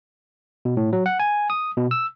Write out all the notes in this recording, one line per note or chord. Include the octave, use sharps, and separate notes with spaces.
B2
A2
F#3
F#5
G#5
D#6
B2
E6